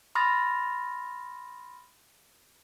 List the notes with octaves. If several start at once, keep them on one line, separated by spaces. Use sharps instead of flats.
B5 C6 D#6 F6 A6 A#6